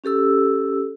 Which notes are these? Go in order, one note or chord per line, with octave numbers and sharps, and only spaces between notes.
C#4 G4 A4 E6